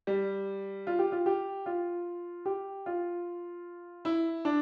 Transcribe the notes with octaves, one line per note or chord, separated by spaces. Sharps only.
G3
F4
G4
F4
G4
F4
G4
F4
E4
D4